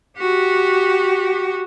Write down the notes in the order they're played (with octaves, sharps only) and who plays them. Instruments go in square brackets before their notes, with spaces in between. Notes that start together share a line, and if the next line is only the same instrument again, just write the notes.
[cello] F#4 G4